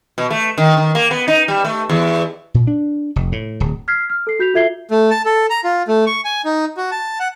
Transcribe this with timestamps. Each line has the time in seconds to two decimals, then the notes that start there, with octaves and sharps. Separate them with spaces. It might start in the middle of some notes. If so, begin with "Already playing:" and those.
0.18 B2
0.30 A3
0.58 D#3
0.77 D#3
0.95 A#3
1.11 B3
1.28 D#4
1.48 G3
1.65 A3
1.89 E2
2.54 A#2
2.67 D4
3.16 F1
3.32 A2
3.60 D1
3.88 F6 G#6 B6 C7
4.10 F6
4.27 A4 C7
4.39 F#4 G6 B6 F7
4.54 F4 A4 E5 G#6 C7 G7
4.91 A3
5.10 A5
5.25 A4
5.50 A#5
5.64 F4
5.88 A3
6.06 C#6
6.25 G#5
6.45 D#4
6.77 F#4
6.92 A5
7.20 F#5